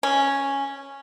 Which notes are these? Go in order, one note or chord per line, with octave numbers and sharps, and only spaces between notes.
C#4